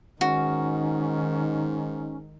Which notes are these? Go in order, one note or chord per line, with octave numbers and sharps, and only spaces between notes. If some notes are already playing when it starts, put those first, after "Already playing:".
G#2 D#3 C#4 F#4